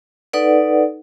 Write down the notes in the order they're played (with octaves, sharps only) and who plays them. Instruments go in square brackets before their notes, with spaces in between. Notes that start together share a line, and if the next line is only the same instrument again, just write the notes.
[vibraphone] D#4 A4 B4 D5 F#5